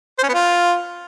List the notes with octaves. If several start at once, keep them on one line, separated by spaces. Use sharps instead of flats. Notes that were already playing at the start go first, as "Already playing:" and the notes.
C5
C#4
B3
F4